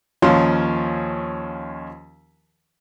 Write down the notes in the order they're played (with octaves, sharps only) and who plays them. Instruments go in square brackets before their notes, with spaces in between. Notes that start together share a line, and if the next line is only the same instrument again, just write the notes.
[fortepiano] D#2 F3 C#4 F5 C6